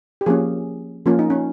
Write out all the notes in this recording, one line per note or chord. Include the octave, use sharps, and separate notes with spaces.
G4
F3 A#3 C#4 G#4
F3 A#3 C#4 F4
D#4
C#4